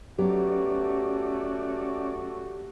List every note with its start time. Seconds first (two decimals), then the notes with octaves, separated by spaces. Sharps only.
0.18 F#3 A3 B3 C#4 F#4 G4 D5